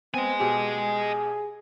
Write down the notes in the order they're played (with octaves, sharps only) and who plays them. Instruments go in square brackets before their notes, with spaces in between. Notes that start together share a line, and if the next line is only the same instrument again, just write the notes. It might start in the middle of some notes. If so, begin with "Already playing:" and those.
[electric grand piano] B3 [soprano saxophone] C4 [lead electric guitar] D#5 G#5
[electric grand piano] B2 G4 [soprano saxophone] G#4